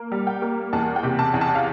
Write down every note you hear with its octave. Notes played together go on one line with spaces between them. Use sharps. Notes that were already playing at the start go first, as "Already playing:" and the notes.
Already playing: A#3
G3
G5
A#3
E2 A5
G5
C3
A5
E2
A5
F5